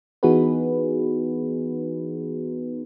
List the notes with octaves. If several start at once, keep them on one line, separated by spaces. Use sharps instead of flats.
E3 B3 D#4 F#4 G#4 B4